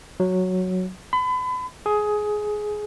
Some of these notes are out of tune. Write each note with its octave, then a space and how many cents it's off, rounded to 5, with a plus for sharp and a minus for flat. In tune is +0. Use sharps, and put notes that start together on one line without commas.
F#3 -5
B5 +35
G#4 +15